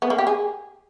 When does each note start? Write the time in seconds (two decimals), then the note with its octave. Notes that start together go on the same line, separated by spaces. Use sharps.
0.02 B3
0.10 A#3
0.18 G4
0.27 G#4